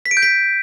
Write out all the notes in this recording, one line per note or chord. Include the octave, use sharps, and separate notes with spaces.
B6
D7
G6
B6